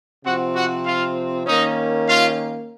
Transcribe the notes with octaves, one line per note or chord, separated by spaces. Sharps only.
C3 F3 C4 F#4 F#5
F#4 F#5
F4 F5
D#3 A#3 C#4 D#4 D#5
F4 F5